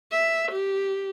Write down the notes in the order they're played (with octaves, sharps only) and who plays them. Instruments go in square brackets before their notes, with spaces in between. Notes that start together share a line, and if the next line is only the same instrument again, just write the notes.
[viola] E5
G4